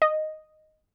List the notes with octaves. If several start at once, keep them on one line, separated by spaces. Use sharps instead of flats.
D#5